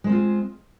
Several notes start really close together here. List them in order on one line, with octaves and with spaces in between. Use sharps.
G#3 C5 C4 F4 G#4